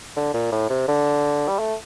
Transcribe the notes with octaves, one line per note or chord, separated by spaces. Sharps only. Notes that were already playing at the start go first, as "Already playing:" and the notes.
D3
A#2
A2
C3
D3
G3
A3